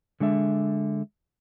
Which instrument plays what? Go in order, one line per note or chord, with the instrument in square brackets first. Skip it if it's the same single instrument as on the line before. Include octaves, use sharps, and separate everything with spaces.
[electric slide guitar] D3 G#3 D4 E5